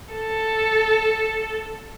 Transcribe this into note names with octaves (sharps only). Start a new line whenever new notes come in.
A4